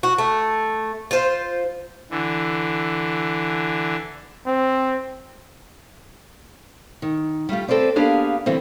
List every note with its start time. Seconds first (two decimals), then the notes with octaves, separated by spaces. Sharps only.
0.03 F#4
0.18 A3
1.11 F4 C5
2.11 D3 E3
4.46 C4
7.02 D#3
7.49 G3 A3 F4 G4
7.68 C4 A4 B4 C5 D5
7.96 A#3 B3 D4 G4 G#4 F5
8.46 D3 E3 F#3 G3 C4